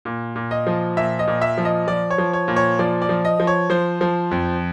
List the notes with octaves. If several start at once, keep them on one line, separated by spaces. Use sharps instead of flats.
A#2
A#2
D#5
F3
A#2 E5
D#5
A#2
E5
F3
D#5
F3 D5
C#5
F3
C#5
A#2
C#5
F3 D5
D5
F3
D#5
F3
C#5
F3 C5
F3
F2